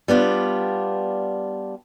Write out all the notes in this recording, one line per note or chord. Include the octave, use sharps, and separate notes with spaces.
G3 B3 D4 F4